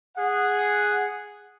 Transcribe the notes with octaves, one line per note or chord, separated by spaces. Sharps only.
G#4 F#5